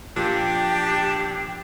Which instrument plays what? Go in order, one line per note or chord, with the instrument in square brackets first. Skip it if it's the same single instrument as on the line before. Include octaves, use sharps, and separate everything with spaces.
[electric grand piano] A#2 F3 [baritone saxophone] D4 [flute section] G4